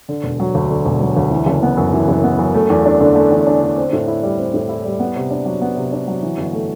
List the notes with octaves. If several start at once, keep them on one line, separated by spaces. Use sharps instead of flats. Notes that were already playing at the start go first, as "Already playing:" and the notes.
D3
E1
F#3
D2
D3
E1
F#3
D2
E3
F#1
B3
F#2
E3
F#1
B3
F#2
A3
E2
D4
D3
A3
E2
D4
D3
C4
A2
E4
G3
C4
A2
E4
G3
B3
C3
D4
F#3
B3
C3
D4
F#3
E3
G1
A3